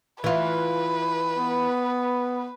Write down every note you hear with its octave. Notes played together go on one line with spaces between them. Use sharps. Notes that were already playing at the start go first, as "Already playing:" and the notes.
E3 F4 B4
B3